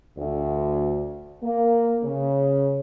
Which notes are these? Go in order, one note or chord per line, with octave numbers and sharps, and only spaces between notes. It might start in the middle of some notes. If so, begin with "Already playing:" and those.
D2
A#3
C#3